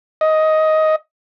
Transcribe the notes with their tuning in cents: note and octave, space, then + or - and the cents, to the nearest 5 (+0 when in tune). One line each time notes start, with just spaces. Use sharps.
D#5 +10